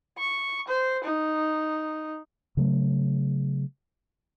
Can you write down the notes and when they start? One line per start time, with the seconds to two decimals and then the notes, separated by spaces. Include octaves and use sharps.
0.18 C#6
0.68 C5
1.04 D#4
2.57 C#3 F#3 A3